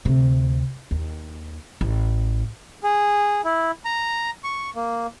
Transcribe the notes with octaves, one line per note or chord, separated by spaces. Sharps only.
D2 C3
D#2
A1
G#4
E4
A#5
C#6
A#3